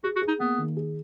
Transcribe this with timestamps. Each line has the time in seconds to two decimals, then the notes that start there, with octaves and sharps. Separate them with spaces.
0.03 F#4 G#4
0.16 F#4
0.22 G#4
0.28 D#4
0.40 A#3 B3
0.58 D#3
0.77 G#4